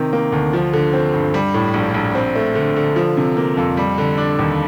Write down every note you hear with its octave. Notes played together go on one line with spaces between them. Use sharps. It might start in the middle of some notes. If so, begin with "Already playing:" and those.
Already playing: C3 D#3
A#3
D2
F3
D3
C4
G2
G3
A2
A#1
A#1
C4
A3
D3
D3
F3
C3
A#3
F2
G3
D3
D4
D#2